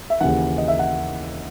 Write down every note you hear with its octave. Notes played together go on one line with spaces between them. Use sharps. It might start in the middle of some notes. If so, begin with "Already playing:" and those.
E5
D#2 C#3 E3 F#5
D#5
E5
F#5